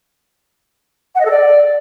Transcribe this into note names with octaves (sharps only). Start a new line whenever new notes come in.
F#5
D#5
A4
D5